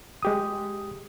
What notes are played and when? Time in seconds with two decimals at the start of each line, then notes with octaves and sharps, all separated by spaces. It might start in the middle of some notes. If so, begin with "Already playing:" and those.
0.23 G#3 G4 D#6